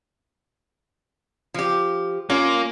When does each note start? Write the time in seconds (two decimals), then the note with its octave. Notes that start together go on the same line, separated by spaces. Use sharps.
1.54 F3 G4
2.30 A#3 C#4 F4